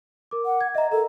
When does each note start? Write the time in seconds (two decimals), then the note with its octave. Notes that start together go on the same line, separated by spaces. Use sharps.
0.31 A#4 D6
0.45 F#5
0.61 G#6
0.75 D#5 E5 A#5
0.91 A4 A#4 A#5